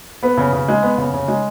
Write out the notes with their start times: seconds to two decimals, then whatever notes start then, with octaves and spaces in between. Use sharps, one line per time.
0.23 B3 B4
0.37 C#3
0.53 C#3
0.68 G#3
0.83 B3
0.98 C#3
1.14 C#3
1.28 G#3